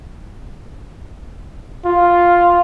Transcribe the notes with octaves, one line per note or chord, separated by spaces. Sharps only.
F4